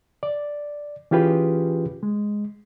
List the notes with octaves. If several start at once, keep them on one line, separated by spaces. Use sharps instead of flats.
D5
E3 C#4 F4 G4 G#4 B4
G#3